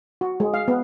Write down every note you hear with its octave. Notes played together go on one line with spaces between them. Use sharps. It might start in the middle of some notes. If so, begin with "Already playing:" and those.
F#4
G#3
F5
B3